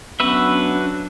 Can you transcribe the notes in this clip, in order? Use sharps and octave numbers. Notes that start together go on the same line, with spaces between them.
F#3 B3 C#4 D4 F#4 B4 E5